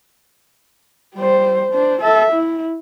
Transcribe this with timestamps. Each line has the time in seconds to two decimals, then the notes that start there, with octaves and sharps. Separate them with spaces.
1.16 G3 C5
1.73 D4 C5
2.02 A4 E5
2.33 E4